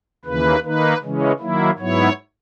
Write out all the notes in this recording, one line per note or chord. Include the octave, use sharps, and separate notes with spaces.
D#2 C#3 E3 A#3 B4
D#3 A#3 D#4 B4
C#3 E3 G#3 C#4
D#3 F#3 A#3 E4
G#2 F#3 B3 E4 C#5